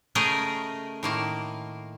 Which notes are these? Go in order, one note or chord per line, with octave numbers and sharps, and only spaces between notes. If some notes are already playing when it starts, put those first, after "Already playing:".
C#3 A3 G#4 A#4 D#5 G5
A2 D#3 A#3